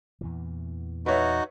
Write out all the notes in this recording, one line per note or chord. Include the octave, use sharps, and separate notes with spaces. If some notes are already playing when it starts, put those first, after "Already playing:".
E2 A#2 E3
D#4 F#4 B4 C#5 E5